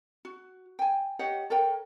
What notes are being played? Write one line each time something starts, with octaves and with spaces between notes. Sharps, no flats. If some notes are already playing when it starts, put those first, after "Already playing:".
F#4
G5 G#5
G4 C#5 D#5 F#5
A4 A#4 C#5 G5